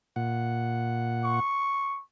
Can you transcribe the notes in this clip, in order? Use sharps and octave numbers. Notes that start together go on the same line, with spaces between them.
A#2 F#5
C#6